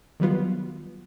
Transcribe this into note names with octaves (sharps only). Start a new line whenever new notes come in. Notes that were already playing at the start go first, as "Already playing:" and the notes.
D#3 F#3 G3 B3 F4